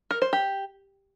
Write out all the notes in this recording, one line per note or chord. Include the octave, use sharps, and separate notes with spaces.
A#4
C5
G4